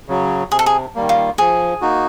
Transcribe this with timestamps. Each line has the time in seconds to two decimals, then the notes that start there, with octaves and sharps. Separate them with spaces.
0.08 C#3 F#3
0.51 C3 G#4
0.59 A4
0.66 G#4
0.95 D#3 G3 A#3
1.09 F4
1.38 F3 G#4
1.82 A#3 D#4 F#4